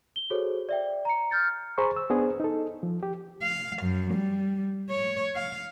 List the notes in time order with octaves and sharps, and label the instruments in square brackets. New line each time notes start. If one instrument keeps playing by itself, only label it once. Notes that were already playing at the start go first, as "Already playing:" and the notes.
[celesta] G7
F#4 G#4 A4 C5 C#5
D5 E5 G5
A#5 C#7
F6 G6 A6 C#7
[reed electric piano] G#4 C5 A#5 B5 C#6
E6
B3 D4 G#4 C5
D#4 A4
F3
G4
[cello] F5
F#2
G3
C#5
F5